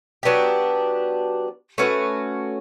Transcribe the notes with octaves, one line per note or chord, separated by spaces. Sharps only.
F#3 B3 D4 G4
A3 C#4 F#4 B4